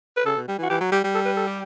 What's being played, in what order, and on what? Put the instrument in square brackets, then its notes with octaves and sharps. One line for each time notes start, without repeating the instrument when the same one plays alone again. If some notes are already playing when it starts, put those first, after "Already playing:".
[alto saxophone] B4
[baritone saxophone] C#3 [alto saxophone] A4
[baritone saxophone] B2
G3
E3
[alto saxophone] F#4
[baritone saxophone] E3 [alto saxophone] G4
[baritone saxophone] F#3
[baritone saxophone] G3 [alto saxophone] G4
[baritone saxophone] G3
[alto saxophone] A4
B4
A4
G4